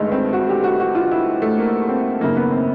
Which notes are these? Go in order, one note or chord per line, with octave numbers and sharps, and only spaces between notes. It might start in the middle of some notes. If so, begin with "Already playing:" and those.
Already playing: G1 G2 D#3 G#3 A3
C4
F#4
G4
F#4
F#4
F4
E4
A3
A#3
C4
G#1 F#2 C#3 A#3
B3
C4